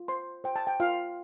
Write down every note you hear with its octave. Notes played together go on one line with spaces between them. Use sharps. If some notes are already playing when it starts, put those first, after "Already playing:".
Already playing: F4
C5 C6
C5 G5
A5
G5
F4 F5